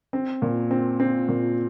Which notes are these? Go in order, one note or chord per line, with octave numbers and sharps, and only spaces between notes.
C4
A#2
C4
C4
A#2